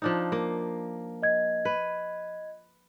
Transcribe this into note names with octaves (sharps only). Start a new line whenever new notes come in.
F3 D4 D#4
A#3
D#5 G#6
B4